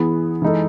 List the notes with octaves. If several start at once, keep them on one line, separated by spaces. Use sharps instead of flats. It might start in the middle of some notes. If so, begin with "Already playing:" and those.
Already playing: E3 B3 E4 G#4
E3 G#3 D#4 A4